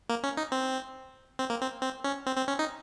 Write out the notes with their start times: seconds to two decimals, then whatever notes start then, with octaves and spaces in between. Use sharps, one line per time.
0.09 A#3
0.23 C#4
0.37 D#4
0.52 C4
1.39 C4
1.50 A#3
1.62 C4
1.82 C4
2.04 C#4
2.26 C4
2.37 C4
2.48 C#4
2.59 D#4